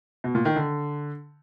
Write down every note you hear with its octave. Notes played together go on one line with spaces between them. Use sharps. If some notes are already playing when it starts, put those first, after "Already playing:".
B2
A#2
D#3
D3